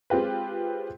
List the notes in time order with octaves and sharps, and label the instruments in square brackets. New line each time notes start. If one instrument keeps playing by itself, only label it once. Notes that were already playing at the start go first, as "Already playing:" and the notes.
[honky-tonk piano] G#3 C4 F4 G4 B4